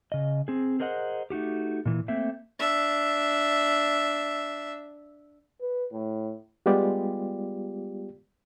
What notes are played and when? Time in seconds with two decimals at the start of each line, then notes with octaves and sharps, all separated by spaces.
0.12 C#3 D#5
0.48 C4 G#4
0.80 G#4 A#4 C5 D#5 F#5
1.30 A3 D#4 F#4 G4
1.86 A#2 E3
2.08 A3 A#3 C4 E5
2.59 D4 E5
5.61 B4
5.93 A2
6.66 G3 G#3 B3 F4 G4 D5